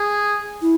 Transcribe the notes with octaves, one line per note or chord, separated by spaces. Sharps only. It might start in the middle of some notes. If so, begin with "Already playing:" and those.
Already playing: G#4
E4